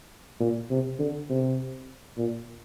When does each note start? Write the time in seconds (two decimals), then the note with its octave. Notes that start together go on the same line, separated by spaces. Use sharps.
0.40 A#2
0.70 C3
0.99 D3
1.29 C3
2.17 A#2